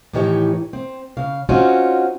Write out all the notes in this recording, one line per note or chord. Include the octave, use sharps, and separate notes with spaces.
A2 D#3 E3 D#4 G4 C#5
C4
C#3 F5
C4 C#4 D#4 F4 F#4